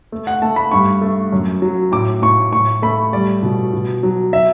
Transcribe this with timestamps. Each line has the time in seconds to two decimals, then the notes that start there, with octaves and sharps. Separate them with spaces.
0.12 A3
0.27 F#5
0.42 A3 A5
0.56 B5
0.71 G2 C#6
1.01 A3
1.32 F#2
1.62 F#3
1.92 A2 D6
2.22 A2 C#6
2.53 A2 C#6
2.82 A3 B5
3.13 G3 D5
3.42 B2
3.73 B2
4.03 F#3
4.33 E5